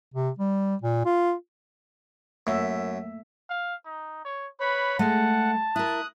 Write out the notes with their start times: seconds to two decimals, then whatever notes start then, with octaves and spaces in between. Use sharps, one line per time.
0.14 C3
0.39 G3
0.82 A#2
1.05 F4
2.47 F#2 A3 A#3 E5
3.50 F5
3.85 D#4
4.25 C#5
4.60 B4 C#5 B5
4.99 G#3 A3 F#5 A5
5.76 E4 A#4 D#6 F#6